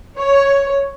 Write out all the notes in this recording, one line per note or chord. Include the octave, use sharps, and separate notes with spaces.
C#5